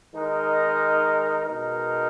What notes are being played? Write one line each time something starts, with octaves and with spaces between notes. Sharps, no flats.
D#3 G#3 D#4 A#4
B2 G#3 D#4 A#4